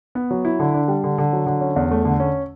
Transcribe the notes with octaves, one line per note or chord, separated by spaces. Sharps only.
B3
F#3
E4
D3
D4
G3
D3
D3
F#3
D3
C#4
E2
A3
D3
C#4